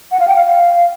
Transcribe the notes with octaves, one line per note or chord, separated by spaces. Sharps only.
F#5
F5
G5
F5